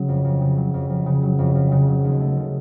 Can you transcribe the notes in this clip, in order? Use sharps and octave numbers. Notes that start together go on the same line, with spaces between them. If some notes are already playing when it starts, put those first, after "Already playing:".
Already playing: C#3 F#3
F2
F2
C#3
F#3
F2
F2
C#3
F#3
F2
F2
C#3
F#3
D#2
A3
C#3